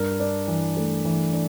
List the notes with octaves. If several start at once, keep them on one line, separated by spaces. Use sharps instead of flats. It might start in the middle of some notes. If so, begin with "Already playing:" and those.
Already playing: G2 A#4
D4
E3
A3
E3
D4